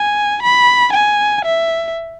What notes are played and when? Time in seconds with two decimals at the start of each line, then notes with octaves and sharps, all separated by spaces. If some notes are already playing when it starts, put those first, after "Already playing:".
Already playing: G#5
0.43 B5
0.94 G#5
1.45 E5